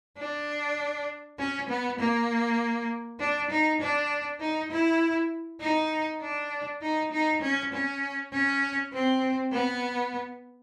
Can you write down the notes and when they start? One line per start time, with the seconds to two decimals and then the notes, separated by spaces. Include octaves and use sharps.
0.18 D4
1.39 C#4
1.69 B3
1.99 A#3
3.19 D4
3.50 D#4
3.81 D4
4.40 D#4
4.71 E4
5.60 D#4
6.21 D4
6.82 D#4
7.12 D#4
7.41 C#4
7.73 C#4
8.32 C#4
8.92 C4
9.53 B3